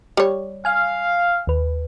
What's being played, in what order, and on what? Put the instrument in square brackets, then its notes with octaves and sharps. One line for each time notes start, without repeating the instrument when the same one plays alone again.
[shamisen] G3 C#5
[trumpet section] F5 [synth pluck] G#5 F6
[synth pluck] D#2 B4